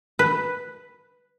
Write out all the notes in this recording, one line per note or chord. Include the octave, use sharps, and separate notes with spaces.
B4